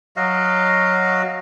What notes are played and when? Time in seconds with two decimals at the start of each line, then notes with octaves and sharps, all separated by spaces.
0.16 F#3 F#4 D#5 F5